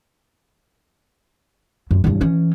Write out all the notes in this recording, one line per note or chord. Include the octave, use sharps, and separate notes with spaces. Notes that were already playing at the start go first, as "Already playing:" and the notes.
F#2
E2 G2
E3 C#4